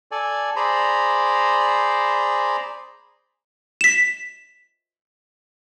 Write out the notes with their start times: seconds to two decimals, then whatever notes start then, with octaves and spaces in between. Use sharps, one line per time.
0.11 A4 D5 G#5
0.56 G#4 C5 D5 A#5 B5
3.81 B6 E7